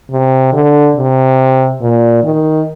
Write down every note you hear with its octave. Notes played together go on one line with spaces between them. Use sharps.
C3
D3
C3
A#2
D#3